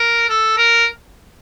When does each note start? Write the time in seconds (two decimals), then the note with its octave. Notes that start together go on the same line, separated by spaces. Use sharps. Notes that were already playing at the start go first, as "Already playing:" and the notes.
Already playing: A#4
0.29 A4
0.57 A#4